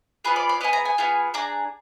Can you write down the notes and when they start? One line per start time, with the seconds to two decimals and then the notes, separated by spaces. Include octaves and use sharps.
0.25 B3 F4 G#4 B4
0.36 D5
0.49 D5
0.61 B3 F4 G#4 D#5
0.73 A#5
0.85 G#5
0.98 B3 F4 G#4
1.34 D4 G#4 A#5